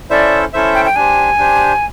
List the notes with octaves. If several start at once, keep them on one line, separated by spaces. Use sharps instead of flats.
C#4 E4 A4 C5 D5 E5
C#4 E4 A4 C5 E5
G5
G5
D4 G4 C5 G#5
D4 G4 C5